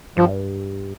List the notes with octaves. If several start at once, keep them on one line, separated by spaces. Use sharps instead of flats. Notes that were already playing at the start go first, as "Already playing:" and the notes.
G2 F3